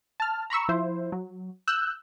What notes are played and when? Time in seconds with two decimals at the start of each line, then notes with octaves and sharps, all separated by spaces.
0.20 A5 F6
0.50 A#5 B5 C#6 E6
0.69 F3 E4 C5
1.12 F#3
1.68 E6 F#6 G6